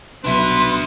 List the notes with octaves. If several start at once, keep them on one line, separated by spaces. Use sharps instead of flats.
C2 B2 F#3 D4 B4 E5 C6